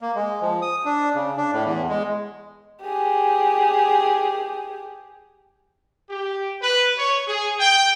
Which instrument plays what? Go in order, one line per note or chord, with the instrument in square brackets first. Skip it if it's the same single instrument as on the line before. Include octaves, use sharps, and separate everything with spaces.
[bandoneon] A#3
G#3
F3
D#6
D4
C#3
D4
A2
E2
G#3
[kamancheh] G4 G#4
[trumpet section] G4
B4
C#5
G#4
G5